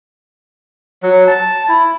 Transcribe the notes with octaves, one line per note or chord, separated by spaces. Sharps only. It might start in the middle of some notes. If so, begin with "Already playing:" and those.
F#3
A5
E4